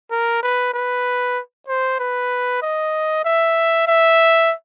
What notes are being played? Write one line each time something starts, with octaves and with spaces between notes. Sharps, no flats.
A#4
B4
B4
C5
B4
D#5
E5
E5